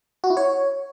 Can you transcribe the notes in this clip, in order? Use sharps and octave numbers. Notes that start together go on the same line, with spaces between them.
F#4
E4
C#5